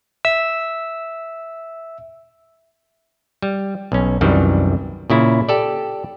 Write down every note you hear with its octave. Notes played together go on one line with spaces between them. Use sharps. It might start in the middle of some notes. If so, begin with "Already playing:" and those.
E5 E6
G3
B1 C#4
C2 F#2 D#3 E3 G3
A#2 C#3 E4
G4 A4 D5